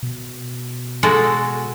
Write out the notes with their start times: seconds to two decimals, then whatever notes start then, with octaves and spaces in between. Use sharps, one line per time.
0.03 B2
1.03 G#3 F#4 A4